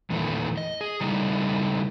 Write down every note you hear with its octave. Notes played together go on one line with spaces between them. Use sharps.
E2 A#2 D#3 E3 A3
D#5
G#4
C#3 G3 A3 D#4 E4